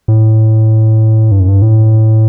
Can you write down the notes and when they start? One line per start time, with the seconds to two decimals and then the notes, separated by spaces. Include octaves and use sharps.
0.08 A2
1.31 G2
1.40 F#2
1.48 G2
1.62 A2